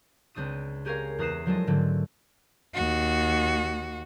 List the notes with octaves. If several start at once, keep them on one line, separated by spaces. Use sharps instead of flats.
C#2 C4 D4 D#6 D#7
C#4 G4 G#4 A#4 C#5 F5
E2 A#4 D#6 F#6 C7 E7
F3 F#3 G#3 D4 A4 D#5
G#2 D3 F#3 A3 C4
D#2 F#4